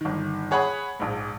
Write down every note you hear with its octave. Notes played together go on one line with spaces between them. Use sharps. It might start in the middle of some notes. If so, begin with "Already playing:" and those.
G1 D#3
G#4 C#5 F#5 B5 D#6
A#1 G#2